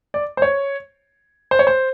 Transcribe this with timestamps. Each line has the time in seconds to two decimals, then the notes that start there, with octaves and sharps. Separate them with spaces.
0.14 D5
0.37 C5
0.42 C#5
1.51 C5
1.59 C#5
1.67 C5